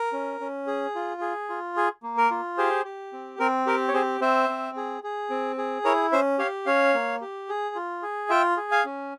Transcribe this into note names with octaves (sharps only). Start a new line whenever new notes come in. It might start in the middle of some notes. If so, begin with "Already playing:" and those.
Already playing: A#4
C#4
C#4
G#4
F4
G#4
F4
G#4
A#3
A#4
F4
G4 G#4 C5
G4
C4
C4 A#4
G4 A#4
C#5
C4 G#4 C5
C4 C5 E5
C4
G#4
G#4
C4
G#4
E4 A#4 C#5
C#4 C5 E5
G4 C#5 F5
C#4 C#5 F5
A#3
G4
G#4
F4
G#4
F4 E5 G5
G#4
F5 G#5
C#4